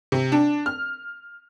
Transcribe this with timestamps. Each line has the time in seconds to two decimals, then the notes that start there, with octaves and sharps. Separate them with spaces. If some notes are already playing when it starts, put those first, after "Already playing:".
0.12 C3
0.32 D4
0.66 F6